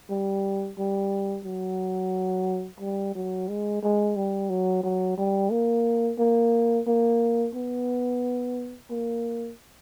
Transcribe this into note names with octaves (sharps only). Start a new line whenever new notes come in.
G3
G3
F#3
G3
F#3
G#3
G#3
G3
F#3
F#3
G3
A#3
A#3
A#3
B3
A#3